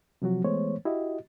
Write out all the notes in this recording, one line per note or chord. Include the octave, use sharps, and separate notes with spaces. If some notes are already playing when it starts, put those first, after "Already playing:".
C3 F3 F#3 F#4
E3 G#3 A3 B3 C5 C#5
E4 F#4 G4 D#5